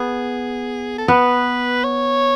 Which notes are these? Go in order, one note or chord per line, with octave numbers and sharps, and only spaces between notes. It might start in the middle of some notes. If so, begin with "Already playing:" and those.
Already playing: B3 G#4
A4
B3 B4
C#5